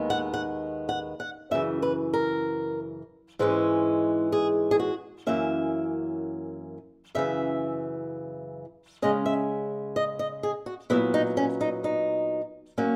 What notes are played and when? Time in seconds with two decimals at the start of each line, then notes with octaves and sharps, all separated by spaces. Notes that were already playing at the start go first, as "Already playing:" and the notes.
Already playing: D#2 D#3 G#3 B3
0.10 F#5
0.34 F#5
0.89 F#5
1.20 F#5
1.51 F#2 C#3 E3 E5
1.82 B4
2.13 A#4
3.39 G#2 E3 G#3 C#4
4.32 G#4
4.71 G#4
4.80 F#4
5.27 F#2 E3 A#3 C#4 E5
7.15 F#2 C#3 E3 E5
9.02 C#3 G#3 C#4 D#5
9.26 E5
9.96 D#5
10.19 D#5
10.43 G#4
10.66 F#4
10.90 A#2 F#3 B3 E4
11.14 D#4
11.37 C#4
11.61 D#4
11.84 D#4
12.78 F#3 A#3 C#4